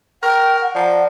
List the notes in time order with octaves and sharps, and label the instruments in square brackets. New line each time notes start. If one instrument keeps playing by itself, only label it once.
[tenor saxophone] A#4 [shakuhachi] G5 [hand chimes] C#6
[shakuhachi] F#5
[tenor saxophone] F3 [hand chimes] D5 A5 A#5